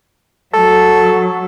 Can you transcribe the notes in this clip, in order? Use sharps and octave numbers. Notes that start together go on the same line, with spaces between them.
F#3 A4